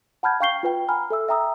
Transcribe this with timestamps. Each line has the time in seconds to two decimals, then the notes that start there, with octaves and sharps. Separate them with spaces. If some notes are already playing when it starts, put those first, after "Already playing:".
0.23 F#5 A5 B5 F6 G6 G#6
0.40 F5 G5 C#6 G6 C7 G7
0.63 F4 B4 G5
0.89 F#5 G#5 A#5 B5 F6
1.10 A4 E5 E6
1.28 E5 G5 A#5 D#6 E6